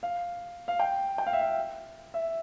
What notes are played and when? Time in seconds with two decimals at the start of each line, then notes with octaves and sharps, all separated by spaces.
0.03 F5
0.68 F5
0.79 G5
1.18 G5
1.26 F5
1.33 E5
1.41 F5
2.14 E5